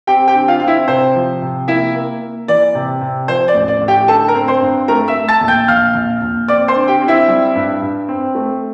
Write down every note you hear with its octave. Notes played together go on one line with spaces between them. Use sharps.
C4 G4 G5
G4 G5
D3
F4 F5
C4 F5
E4 E5
C3 C5
F3
C3
A#3 E4 E5
A#3
A#3
E3 D5
C3
C3
F3 C5
D5
A1
D5
A2
G4 G5
D3 A4 A5
A#4 A#5
C4
C5 C6
G2
A3 A#4 A#5
E5 E6
A3
A5 A6
A#1
G5 G6
A#1 F5 F6
A#1
A#1
C4 D5 D6
C5 C6
D3
G4 G5
C4
E4 E5
G3
G2
G2
C4
A3